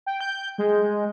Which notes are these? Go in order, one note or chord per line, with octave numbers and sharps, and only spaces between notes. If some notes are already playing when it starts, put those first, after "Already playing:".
G5
G6
G#3